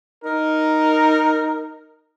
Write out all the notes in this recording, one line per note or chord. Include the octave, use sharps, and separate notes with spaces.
D#4 A#4